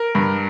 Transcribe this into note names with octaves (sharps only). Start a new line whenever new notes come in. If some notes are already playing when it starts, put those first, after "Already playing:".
Already playing: A#4
G2